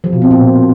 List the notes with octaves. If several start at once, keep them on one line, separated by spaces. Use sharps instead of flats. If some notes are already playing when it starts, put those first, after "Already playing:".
F3
B2
C4
A#2